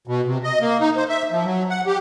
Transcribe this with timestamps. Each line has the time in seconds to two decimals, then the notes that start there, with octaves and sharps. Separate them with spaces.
0.07 B2
0.26 C3
0.43 D#5
0.61 A#3
0.81 D#4
0.96 C5
1.09 E5
1.31 F3
1.45 F#3
1.70 F#5
1.87 G4